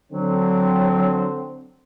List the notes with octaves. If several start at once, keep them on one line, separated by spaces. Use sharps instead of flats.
D3 F#3 C4